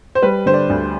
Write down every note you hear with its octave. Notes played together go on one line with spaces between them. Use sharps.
C5
G3 B4
D3 C5
D5
D2